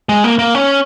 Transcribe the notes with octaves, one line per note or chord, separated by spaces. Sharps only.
G#3
A#3
A#3
C#4